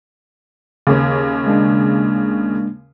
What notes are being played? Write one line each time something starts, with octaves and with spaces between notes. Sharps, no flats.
D#2 C#3
G#3 A#3 D4